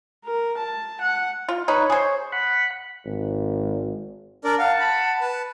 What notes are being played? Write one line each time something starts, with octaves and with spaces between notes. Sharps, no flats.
A#4
A5
F#5
F4
D#4 B4 C#5
G#4 C5
F#5 B5
G#1
D4 A#4 D5
F5 F#5 A5
B5
B4 A5